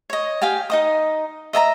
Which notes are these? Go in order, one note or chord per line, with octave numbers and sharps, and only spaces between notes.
C#5 D#5
G4 F5 G5 G#5
D#4 D#5 D#6
D#5 E5 A5 A#5